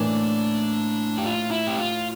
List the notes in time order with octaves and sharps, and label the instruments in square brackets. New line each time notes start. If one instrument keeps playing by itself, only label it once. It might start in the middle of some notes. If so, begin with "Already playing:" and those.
Already playing: [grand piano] A2 E3 A#3 [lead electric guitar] D4
[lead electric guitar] G4
F4
E4
G4
F4